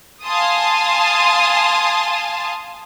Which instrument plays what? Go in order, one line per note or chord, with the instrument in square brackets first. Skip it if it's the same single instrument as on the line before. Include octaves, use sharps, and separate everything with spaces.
[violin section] F5 G#5 A5 C6 D#6